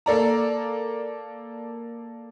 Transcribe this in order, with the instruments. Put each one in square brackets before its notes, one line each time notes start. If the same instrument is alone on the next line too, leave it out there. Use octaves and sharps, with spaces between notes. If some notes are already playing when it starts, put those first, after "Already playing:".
[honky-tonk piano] A#3 A4 D5 A#5